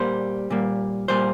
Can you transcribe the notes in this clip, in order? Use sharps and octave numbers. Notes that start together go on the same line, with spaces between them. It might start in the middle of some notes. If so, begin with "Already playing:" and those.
Already playing: A#2 G3 A#3 C5
A#2 G3 A#3
A#2 G3 A#3 C5